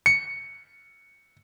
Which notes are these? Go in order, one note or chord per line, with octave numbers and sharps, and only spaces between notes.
C#7